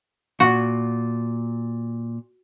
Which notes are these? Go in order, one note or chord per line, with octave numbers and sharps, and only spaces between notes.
A#2 F#4